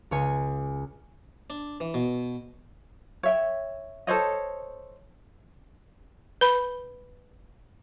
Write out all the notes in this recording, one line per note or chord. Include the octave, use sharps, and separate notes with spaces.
C#2 C#5 G#5
D4
E3
B2
C#5 E5 G5
A4 C5 C#5 D#5
B4 B5